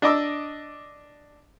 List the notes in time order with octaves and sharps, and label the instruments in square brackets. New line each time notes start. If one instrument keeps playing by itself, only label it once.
[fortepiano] D4 D#5 D6 E6